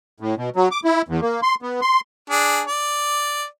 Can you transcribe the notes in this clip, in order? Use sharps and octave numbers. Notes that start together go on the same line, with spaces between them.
A2
B2
F#3
D6
E4
E2
A#3
C6
B3
C6
D4 G#4
D5